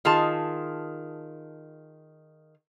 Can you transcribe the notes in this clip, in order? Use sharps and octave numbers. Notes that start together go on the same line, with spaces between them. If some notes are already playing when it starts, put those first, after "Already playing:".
D#3 F4 G#4 A5